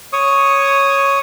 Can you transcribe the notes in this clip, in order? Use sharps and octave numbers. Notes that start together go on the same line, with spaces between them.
C#5 C#6 D#6